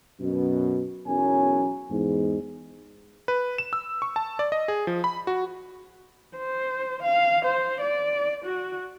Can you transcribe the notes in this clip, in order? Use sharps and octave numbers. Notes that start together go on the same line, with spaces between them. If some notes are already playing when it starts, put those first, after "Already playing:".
F#2 B2
B1 E2 F#3 C#4 A#4 G#5
E2 G#2
B4
E7
E6
C#6
A5
D5
D#5
G#4
F3
B5
F#4
C5
F5
C5
D5
F#4